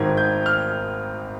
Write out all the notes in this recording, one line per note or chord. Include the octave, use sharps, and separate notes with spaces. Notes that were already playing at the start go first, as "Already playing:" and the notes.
Already playing: G#1 G#2 D#3 G#6
G6
F6